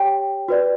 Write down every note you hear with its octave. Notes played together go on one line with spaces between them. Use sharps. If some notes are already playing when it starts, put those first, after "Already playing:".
Already playing: G4 C#5 G5
F#4 B4 D5